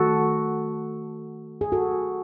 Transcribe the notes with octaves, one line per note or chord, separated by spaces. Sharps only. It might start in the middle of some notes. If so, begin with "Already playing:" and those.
Already playing: D#3 A3 F#4 A4
G#4
F#4 A4